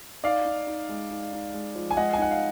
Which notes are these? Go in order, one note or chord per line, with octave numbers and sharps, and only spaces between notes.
D#4 D5 F5
D#4
D#4
G#3
D#4
D#4
G#3
F3
G#5
G#3 D#5 F#5
G#5
D#4 F#5
F5